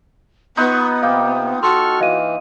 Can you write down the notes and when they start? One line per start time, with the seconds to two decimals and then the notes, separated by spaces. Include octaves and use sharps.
0.57 B3 D#4 F4 B4 C#6
1.03 C3 A#3 F5 G5
1.63 F#4 A4 C6 C#6 F6
2.00 E3 D#5 F5 D#7